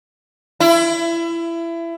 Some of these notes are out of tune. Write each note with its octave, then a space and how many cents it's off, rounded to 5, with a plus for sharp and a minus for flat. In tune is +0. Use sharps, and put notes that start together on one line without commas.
E4 +25